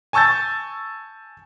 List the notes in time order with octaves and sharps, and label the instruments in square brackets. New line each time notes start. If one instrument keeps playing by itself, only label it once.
[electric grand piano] G#5 A5 C#6 E6 G6 A6